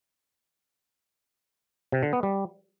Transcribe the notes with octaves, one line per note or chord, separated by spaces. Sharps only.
C3
D3
B3
G3